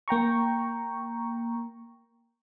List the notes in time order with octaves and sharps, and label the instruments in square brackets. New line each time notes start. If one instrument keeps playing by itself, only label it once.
[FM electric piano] A#3 G5 A#5 C#6